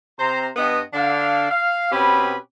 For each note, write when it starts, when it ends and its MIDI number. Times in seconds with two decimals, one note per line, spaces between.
0.18 0.48 48
0.18 0.48 72
0.18 0.48 82
0.56 0.80 43
0.56 0.80 59
0.56 0.80 75
0.93 1.48 50
0.93 1.48 62
0.93 1.48 77
1.50 1.89 77
1.92 2.35 47
1.92 2.35 60
1.92 2.35 61
1.92 2.35 67
1.92 2.35 71
1.92 2.35 83